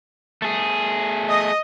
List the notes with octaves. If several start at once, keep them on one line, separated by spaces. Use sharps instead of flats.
A3 G#4
D#5